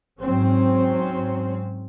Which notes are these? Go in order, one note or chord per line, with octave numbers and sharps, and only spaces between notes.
G#2 F#3 C4 C#4